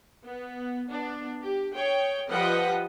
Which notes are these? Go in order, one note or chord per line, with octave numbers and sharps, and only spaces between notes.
B3
B3 D4
G4
G#4 C#5 G5
F3 G3 B4 D#5 F#5 G5